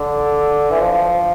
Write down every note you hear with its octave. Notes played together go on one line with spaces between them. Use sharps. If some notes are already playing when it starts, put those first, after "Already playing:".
Already playing: D3
E3
F3
F3